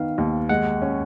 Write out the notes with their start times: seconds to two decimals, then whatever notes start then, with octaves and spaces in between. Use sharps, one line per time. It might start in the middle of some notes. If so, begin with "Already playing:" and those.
Already playing: D#3 B3 F5
0.18 D#2
0.49 G#3 F#5
0.82 C#4